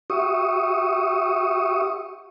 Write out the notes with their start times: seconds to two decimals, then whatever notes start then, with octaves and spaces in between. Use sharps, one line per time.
0.10 F#4 G4 E5 C#6 D#6